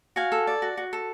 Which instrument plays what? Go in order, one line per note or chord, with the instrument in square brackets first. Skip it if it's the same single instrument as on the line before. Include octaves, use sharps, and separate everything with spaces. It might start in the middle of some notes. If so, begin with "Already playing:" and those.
[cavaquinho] F#4 F5 G#5
A4
D5
F#4
F#4
A4